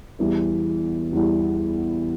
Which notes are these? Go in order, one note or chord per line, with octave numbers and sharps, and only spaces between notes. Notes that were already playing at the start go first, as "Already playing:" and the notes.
E2 E3 G3 E4
E2 E3 G3 E4